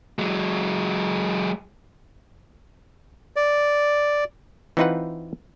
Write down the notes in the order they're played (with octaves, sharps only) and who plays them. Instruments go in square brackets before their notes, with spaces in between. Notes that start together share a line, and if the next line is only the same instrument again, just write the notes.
[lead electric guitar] F#3 G#3
[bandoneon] D5
[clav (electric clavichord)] E3 C4 D#4 F4 B4 F#5